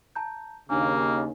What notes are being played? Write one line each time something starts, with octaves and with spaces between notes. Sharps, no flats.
A5 A#5 G6
D#2 C#3 A#3 D4 D#4 G#5